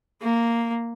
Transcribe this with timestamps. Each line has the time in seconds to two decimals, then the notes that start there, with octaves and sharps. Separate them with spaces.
0.22 A#3